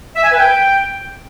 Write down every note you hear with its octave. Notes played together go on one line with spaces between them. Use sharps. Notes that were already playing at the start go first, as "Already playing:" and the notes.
E5
G#5
B4
G5